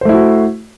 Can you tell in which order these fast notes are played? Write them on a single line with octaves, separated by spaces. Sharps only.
C5 A3 E4 F#4